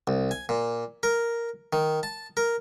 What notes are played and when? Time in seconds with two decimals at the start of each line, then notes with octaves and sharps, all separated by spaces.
0.07 C2
0.31 G#5
0.49 A#2
1.03 A#4
1.73 D#3
2.03 A5
2.37 A#4